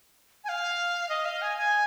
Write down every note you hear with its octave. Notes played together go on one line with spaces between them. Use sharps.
G#5
F5
D#5
F5
G#5
G#5